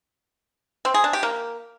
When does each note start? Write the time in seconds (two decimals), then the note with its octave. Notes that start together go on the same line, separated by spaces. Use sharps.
0.85 C4
0.94 G#4
1.04 D4
1.13 G4
1.23 A#3